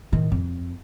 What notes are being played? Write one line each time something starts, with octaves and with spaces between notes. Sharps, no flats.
A2 D#3
F2